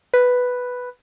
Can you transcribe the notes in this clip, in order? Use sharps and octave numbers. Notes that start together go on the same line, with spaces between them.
B4